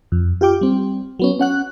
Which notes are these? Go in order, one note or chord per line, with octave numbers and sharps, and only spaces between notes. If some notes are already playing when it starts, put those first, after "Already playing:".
F2
F4 G4 G5 D6
G3 C4
F#3 B3 C#4
C#4 F#5 F#6